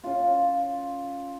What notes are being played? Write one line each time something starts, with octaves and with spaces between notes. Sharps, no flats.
C#3 F4